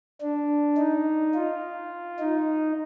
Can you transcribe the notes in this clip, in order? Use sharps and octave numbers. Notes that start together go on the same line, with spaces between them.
D4
D#4
F4
D#4